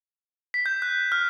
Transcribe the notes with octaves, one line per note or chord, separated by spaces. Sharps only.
B6
G6
F#6
F6